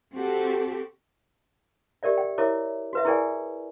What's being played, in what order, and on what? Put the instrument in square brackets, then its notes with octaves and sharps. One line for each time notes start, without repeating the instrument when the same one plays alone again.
[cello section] C4 F#4 G4 A4
[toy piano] G4 A#4 D5 E5
G5
E4 A#4 C#5 E5 D6
F#4 B4 E5
E4 G#4 A#4 D5 G5 G#5